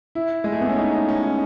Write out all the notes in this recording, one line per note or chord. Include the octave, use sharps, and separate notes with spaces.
E4
G#3
A3
B3
C#4
D#4
C#4
C#4
D#4